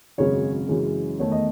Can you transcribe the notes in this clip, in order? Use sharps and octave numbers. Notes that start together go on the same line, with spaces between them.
G#1 F#2 C#3 G#3 C#5
F#2 C#3 E3 G#3
E2 D#3 A3 C#5
D#5